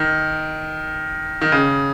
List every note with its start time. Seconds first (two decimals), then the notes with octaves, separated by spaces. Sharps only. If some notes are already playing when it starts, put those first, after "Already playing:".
Already playing: D#3
1.42 D#3
1.52 C#3